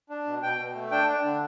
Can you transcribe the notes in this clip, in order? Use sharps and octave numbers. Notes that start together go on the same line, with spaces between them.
D4
B2
B2 G5
B2
A3
D4 G5
D4
D3